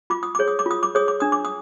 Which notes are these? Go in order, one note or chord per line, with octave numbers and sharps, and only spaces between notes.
F4 D6
D#6
G#4 C#5 D6
D#6
D6
F4 D#6
D6
G#4 C#5 D#6
D6
D4 D#6
D6
D#6